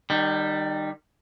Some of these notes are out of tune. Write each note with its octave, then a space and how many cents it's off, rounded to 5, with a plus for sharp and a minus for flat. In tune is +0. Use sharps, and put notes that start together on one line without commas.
D#3 -30 G3 +0